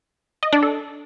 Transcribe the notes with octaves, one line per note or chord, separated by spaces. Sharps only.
D#5
D4
A4